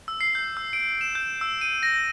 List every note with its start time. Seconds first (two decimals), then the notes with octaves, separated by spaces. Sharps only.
0.08 E6
0.21 C7
0.35 G6
0.57 E6
0.73 D7
1.01 E7
1.15 G6
1.41 E6
1.61 D#7
1.83 A#6